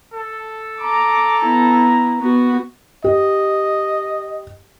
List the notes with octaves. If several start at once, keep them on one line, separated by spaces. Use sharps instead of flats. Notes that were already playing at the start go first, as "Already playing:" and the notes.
A4
A#5 D6
B3 E4
B3 F#4
G4 D#5